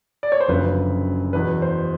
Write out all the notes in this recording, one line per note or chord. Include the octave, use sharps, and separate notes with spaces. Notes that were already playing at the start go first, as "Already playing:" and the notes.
D5
C#5
C5
F#1 F#2 D3 F3 B4
E1 E2 B2 B4
C5